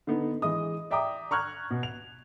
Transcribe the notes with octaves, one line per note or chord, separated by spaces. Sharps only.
D3 B3 D#4
E3 G#3 D#5 D#6
D5 E5 G5 A#5 D6 D#6
A#5 C#6 F6 F#6 G#6
B2
F7